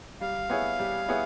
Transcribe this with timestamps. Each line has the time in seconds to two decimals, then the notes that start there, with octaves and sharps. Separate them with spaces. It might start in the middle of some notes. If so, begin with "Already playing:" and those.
0.21 G3 F5
0.50 B3 E4 G#4 C#5
0.79 G3
1.09 B3 E4 G#4 C#5